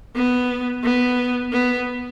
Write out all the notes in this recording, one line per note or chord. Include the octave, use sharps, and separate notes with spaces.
B3
B3
B3